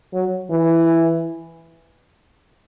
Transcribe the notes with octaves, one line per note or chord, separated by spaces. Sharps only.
F#3
E3